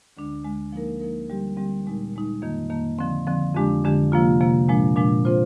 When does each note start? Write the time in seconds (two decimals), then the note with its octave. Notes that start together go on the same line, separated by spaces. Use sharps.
0.17 D2 D3 G#3 D4
0.44 D2 D3 G#3 D4
0.72 F3 A#3 D#4 A#4
1.00 F3 A#3 D#4 A#4
1.29 D3 G3 C4 G4
1.57 D3 G3 C4 G4
1.86 A#2 G#3 D#4
2.14 A#2 G#3 D#4
2.42 F2 D#3 A#3
2.70 F2 D#3 A#3
2.98 D3 F3 C4
3.27 D3 F3 C4
3.55 F2 D3 G#3 D4 G4
3.84 F2 D3 G#3 D4 G4
4.12 C3 F3 A#3 F4
4.40 C3 F3 A#3 F4
4.68 A#2 F3 G#3 D4
4.96 A#2 F3 G#3 D4
5.25 F3 C4 F4 C5